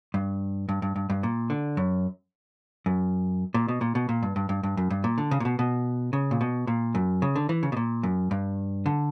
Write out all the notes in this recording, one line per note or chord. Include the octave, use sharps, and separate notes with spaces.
G2
G2
G2
G2
G2
A#2
D3
F#2
F#2
A#2
B2
A#2
B2
A#2
G2
G2
G2
G2
F#2
G2
A#2
D3
C#3
A#2
B2
B2
C#3
A#2
B2
A#2
F#2
C#3
D3
E3
C#3
B2
A#2
F#2
G2
D3